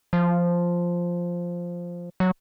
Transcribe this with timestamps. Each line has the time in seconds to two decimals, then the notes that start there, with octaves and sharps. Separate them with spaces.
0.13 F3
2.20 F#3